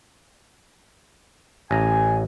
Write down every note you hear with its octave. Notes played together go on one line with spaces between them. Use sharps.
A1 G#5 A#5